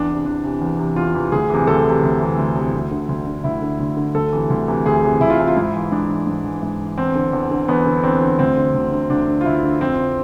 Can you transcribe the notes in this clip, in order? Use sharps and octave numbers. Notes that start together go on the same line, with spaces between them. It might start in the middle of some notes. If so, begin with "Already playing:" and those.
Already playing: E2 D4
C3 E3
E2 D4
C3 E3
E2
C3 E3
E2 F4
C3 E3
D2 G#4
C3 E3
D2 A4
C3 E3
D2
C3 E3
D2
C3 E3
D2
D3
D2
D3
D2 E4
D3
D2
D3
D2 A4
C3 E3
D2
C3 E3
D2 G#4
C3 E3
D2 E4
F4
C3 E3 E4
F4
G#2 E4
E3
G#2 D4
E3
G#2
E3
G#2
E3
E2 C4
D3
E2
D3
E2 B3
D3
E2 C4
D3
D2 C4
D3
D2
D3
D2 D4
D3
F4
D2 E4
D3
F2 C4
D3